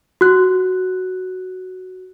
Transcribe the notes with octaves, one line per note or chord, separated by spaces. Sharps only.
F#4 F#6